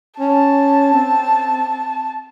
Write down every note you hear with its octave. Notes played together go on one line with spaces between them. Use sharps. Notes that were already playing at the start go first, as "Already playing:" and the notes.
C#4 A5
C4